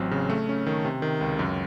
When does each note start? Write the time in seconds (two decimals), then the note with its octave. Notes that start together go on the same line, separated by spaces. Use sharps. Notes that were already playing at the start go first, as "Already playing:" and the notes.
Already playing: A1 F#3 C4
0.11 C#3
0.30 A3
0.49 C#4
0.67 D#3
0.85 C3
1.02 D#3
1.21 C#2
1.39 F#2